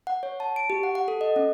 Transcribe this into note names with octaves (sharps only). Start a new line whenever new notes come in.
F#5
C#5
A5
D7
G4
F#5
F#5
A4
D#5
C#4